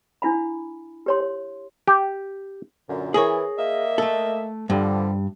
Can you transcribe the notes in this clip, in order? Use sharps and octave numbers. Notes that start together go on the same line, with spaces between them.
D4 E4 F5 B5
G4 C#5 C6
C#5
G4
F#2 A#2 D3
E3 G#4 A#4 C#5
A#3 D#5 E5
A3 A4
G2 D3 F3 G3